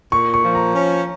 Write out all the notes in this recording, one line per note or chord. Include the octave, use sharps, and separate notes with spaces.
A#2 C#6
C#6
F3
A#5
C#4